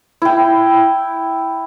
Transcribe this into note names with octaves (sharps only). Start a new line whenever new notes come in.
E4 G5